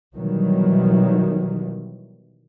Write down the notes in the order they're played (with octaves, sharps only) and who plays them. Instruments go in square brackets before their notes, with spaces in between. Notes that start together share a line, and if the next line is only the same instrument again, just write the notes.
[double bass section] B2 D#3 E3 F#3 G3